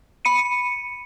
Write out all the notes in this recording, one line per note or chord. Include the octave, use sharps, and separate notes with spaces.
B5 C#7 D#7